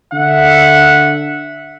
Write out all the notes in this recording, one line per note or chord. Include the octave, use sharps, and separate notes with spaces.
D3 E5 F#5